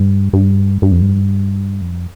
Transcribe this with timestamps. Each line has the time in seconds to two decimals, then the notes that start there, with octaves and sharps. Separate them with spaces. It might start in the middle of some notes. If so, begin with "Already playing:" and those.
Already playing: G2
0.33 G2
0.82 G2
0.92 F2
1.01 G2
1.81 F2